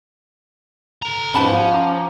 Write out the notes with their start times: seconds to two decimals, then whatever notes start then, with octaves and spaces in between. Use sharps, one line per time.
1.02 A4 A#5
1.34 G#1 E2 G#2 F3 C#4 B4 A5 B5
1.53 F4 F#5
1.73 F5 A#5 D6